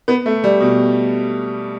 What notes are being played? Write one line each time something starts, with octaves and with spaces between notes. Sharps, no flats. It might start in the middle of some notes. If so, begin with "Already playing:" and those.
B3
A3
G3
B2